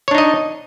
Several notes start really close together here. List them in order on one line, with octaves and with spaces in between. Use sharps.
C#5 D4 D#4 D#5